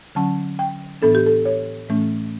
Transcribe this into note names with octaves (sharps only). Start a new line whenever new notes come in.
D3 F#3 C#4 A5
G5
A2 E3 B3 D4 A4
G4
A4
C#5
A2 E3 A3 C#4